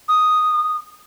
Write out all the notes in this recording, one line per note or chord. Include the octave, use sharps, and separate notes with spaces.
D#6